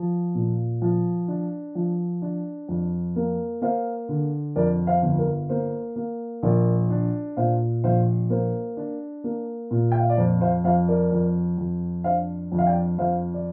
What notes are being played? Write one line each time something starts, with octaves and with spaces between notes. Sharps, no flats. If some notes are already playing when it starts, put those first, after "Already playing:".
Already playing: F3
A#2
F3
D4
F3
D4
F2
A#3
A#3 C5 F5
D3
F2 A#4 D5
C5 F5
G1
A#4
A#3 C5
A#3
A#1 A#4 D5
D4
A#2 C5 F5
A#1 C5 F5
A#3 C5
D4
A#3
A#2
G5
F5
D5
F2 C5
C5 F5
F2 C5 F5
A#4 D5
F2
F2
D4 C5 F5
F2
F5
D5 G5
F2 C5 F5
D5